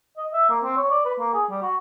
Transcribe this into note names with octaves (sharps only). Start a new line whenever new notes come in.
D#5
E5
A#3
C4
C#5
D5
B4
A#3
G#4
G3
F#4